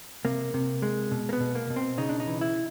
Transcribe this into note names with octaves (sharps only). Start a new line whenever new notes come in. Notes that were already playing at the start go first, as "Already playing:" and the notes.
C3 A#3
C3
G#3
B2
A#3
B3
B2
A#3
B2
C4
C#3 D#4
D4
D#4
E3
E4